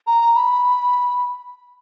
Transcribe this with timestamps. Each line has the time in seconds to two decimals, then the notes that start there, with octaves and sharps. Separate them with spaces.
0.07 A#5
0.36 B5